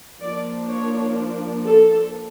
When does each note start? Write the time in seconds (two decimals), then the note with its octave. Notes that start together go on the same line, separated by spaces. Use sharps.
0.21 F3 A#3 D4 D5
0.69 C#5
1.66 A4